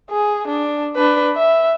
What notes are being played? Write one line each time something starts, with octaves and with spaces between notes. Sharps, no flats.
G#4
D4
D4 B4
E5